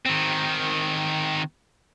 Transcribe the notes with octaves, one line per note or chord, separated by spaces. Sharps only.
D#3 C4